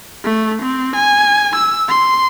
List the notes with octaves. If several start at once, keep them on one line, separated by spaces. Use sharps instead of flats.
A3
C4
G#5
E6
C6